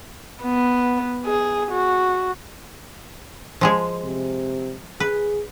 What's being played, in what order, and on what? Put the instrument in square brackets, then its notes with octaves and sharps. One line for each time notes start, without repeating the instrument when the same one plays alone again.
[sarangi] B3
G#4
F#4
[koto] F3 G#3 G#4
[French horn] C3
[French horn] G#4 [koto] B4